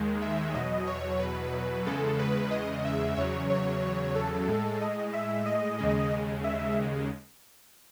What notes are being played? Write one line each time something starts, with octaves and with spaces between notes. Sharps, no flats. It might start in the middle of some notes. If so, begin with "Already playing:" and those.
Already playing: D#2 D#3 G#3
E5
E2 B2 F#3 D#5
C#5
B4
E2 C#3 G#3 A4
B4
D#5
E5
E2 C#3 F#3 C#5
C#5
A4
A2 G#3
D#5
E5
D#5
D#2 C#3 G#3
E5